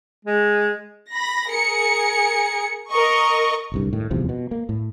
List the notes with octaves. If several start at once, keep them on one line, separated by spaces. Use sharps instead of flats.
G#3
B5 A#6
G#4 A#4 C#7
A#4 D#5 C#6
D1 C2 G2
A2 D#3
D#1 E2 C3 F3
B2
A#3
A2